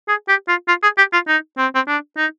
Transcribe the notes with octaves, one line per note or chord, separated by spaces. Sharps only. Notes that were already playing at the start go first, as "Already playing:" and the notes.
G#4
G4
F4
F4
G#4
G4
F4
D#4
C4
C4
D4
D#4